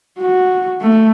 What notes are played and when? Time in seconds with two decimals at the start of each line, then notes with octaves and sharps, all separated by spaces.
0.19 F#4
0.81 A3